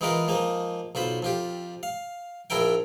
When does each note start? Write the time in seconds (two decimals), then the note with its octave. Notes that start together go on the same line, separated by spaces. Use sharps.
0.01 E3 G#3 D#4 F4 A#4 B4
0.28 F3 G#3 A#3 D#4
0.95 B1 F4 C5 B5
1.22 F2 F4 G4
1.83 F5
2.50 A#1 A#2 E4 A4 A#4 G5